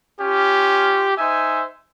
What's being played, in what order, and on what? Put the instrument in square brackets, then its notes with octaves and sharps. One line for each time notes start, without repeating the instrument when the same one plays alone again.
[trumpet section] C#4 F4 G4
D#4 C5 E5 G#5